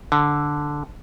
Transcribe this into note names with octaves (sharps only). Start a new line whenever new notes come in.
D3